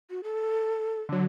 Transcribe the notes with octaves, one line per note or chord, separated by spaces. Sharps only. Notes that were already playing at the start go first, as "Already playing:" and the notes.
F#4
A4
D3 F#3